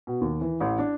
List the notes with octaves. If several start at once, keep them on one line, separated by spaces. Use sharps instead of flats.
B2
D#2
E3
A1
D4